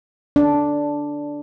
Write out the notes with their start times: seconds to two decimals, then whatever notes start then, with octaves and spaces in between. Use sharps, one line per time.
0.36 D4